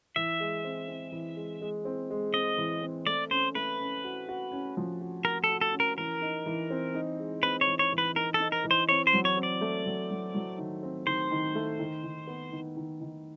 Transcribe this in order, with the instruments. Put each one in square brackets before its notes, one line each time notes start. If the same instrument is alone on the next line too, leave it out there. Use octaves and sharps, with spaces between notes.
[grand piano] E3 [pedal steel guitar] E5
[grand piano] G#3
C4
C4
E3
G#3
G#3
C4
G#3
[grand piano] C4 [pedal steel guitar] D#5
[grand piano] E3
C4
[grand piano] A3 [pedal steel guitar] D5
[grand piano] C#4 [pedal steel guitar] C5
[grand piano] A3 [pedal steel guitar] B4
[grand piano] C#4
F#4
F#4
C#4
F3
F#4
[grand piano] F#4 [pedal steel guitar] A#4
[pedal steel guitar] A4
[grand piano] F#4
[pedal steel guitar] A4
[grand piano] C#4
[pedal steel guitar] A#4
[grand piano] E3 [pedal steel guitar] A#4
[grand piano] D#4
E3
C4
D#4
G#3
[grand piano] C4 [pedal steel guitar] B4
[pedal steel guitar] C#5
[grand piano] E3
[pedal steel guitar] C#5
[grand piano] E3
[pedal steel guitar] B4
[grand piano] D#4 [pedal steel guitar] A#4
[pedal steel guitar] A4
[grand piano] D#4
[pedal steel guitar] A#4
[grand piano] E3
[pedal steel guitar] C5
[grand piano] C4 [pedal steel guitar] C#5
[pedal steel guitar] C5
[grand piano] F#3
[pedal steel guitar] C#5
[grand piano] C4
[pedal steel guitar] D5
[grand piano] A3
F#3
F#3
F#3
D#3
C4
[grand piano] D#3 [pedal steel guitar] C5
[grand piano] D#3
A3
D#3
D#3
B3
D#3
D#3
D#3